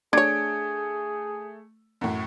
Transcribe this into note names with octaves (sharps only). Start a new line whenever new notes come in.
A3 D4 G#4 C#5 G#6 D7
F#2 A2